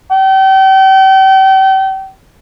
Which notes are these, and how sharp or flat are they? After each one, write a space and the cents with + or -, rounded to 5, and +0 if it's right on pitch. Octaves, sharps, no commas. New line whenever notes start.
G5 -35